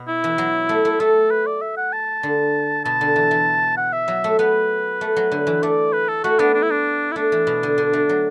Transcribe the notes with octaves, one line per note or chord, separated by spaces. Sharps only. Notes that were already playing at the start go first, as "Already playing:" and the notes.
Already playing: B2
E4
E3
F#3
A3
A3
A3 A4
B4
D5
E5
F#5
A5
D3
B2 A5
D3
E3
E3
F#5
E5
F#3
A3
B3 B4
A3
F#3
D3
E3
A3 D5
B4
A4
A3 F#4
B3 D4
D4
E4
D4
E4
A3 D4
E3
B2
D3
D3
A3
F#3